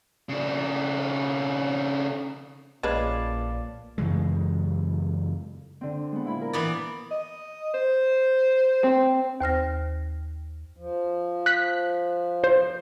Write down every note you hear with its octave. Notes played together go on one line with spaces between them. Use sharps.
C#3 D4
A#1 A#2 G#3 C#4 B4 D5 F5 A5
F#2 C#3 E3 G#3
D3 C4
G#3 B3
A#2 E4 B5
A#4
E3 B3 D5
D#5
C5
C4
D#2 C5 F6 A#6
F3
F#6 B6
C5